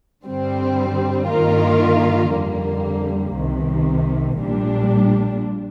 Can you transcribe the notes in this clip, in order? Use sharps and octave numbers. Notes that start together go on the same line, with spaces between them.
G2 D3 G3 C4
G2 D#3 A#3 F4 A#4
F2 D3 G3 A#3
C2 C3 D#3
A#1 A#2 G3 D4